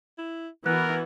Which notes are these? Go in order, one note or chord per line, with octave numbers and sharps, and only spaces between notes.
E4
E3 B3 F#4 A#4 F#6